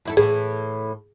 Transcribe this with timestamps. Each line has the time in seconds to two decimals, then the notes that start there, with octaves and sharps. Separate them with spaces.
0.05 E2 E4 A4
0.17 A2 E3 G#4